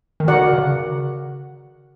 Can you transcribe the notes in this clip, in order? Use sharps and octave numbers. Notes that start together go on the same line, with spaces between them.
D#3
D3 F#4 A#4 D5 F#5
C#3